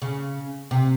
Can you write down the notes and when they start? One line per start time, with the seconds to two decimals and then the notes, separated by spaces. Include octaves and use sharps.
0.02 C#3
0.71 C3